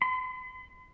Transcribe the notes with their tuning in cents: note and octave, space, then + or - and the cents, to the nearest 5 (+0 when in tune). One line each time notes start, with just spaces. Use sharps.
C6 -45